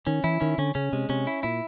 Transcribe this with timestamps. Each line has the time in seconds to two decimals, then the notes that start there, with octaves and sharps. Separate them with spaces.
0.07 D#3 C#4
0.24 E3 E4
0.41 D#3 C#4
0.58 D3 C#4
0.75 C#3 C#4
0.93 C3 G#3
1.09 C3 C#4
1.27 E4
1.43 A#2 E4